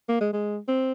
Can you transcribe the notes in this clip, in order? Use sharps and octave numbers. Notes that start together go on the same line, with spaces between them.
A#3
G#3
G#3
C4